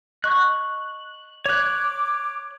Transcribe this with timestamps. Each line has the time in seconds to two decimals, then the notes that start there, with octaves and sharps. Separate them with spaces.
0.24 D#5 C#6 F#6
1.46 C#5 D6 F#6